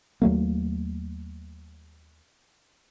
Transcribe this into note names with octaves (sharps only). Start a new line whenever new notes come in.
D#2 F#3 A3 A#3